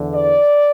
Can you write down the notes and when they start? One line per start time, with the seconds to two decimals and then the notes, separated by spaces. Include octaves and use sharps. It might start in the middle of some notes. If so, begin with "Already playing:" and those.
Already playing: E2 D3
0.14 D5